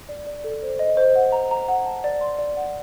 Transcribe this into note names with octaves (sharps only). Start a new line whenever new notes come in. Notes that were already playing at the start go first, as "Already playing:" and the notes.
D5
D5
A4
C5
D#5
C5
F#5
A#5
A#5
F#5
A5
D5
C6
D5
F#5